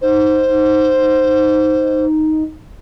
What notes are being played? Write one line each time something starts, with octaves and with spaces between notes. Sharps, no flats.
D#4 C5